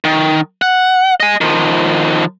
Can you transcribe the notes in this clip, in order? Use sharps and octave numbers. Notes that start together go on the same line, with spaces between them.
D#3
F#5
D#5 G#5
D#3 F3